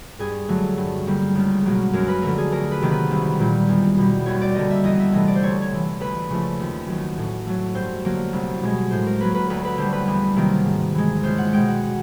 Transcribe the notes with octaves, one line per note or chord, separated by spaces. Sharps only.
G2 G#4
D3 F#3 A3
G2
D3 G3 A#3
C#2
B2 F#3 A#3
F#2 A#4
B4
D3 F3 A3 A#4
G#4
D2 A#4
B4
C3 D#3 F#3 A#3
B4
C2
A#2 G3 A#3
E2
B2 G3
D#2 C#5
D5
D3 G3 A#3 D#5
E5
E2 D#5
E5
C3 E3 A3 D#5
D5
C5
D2 C#5
C#5
C3 E3
D2 B4
C#3 F3 A3
D#2
D#3 F#3
A2
F#3 A3
G2 C5
D3 F#3 A#3
C2
B2 G#3
A2 C5
A#4
F#3 A#3 B4
B4
D2 B4
B4
D3 G3 C5
B4
E2
C3 D#3 F#3 A#3
G#2
E3 G#3
C#2 C5
F#5
B2 G#3 G5
F#5